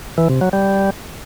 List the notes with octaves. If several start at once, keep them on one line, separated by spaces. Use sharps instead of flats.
E3
C3
F#3
G3